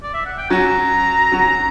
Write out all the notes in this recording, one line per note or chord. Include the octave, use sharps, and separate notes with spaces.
D5
E5
F#5
G5
F#3 C#4 F#4 A#5
F#3 C#4 F#4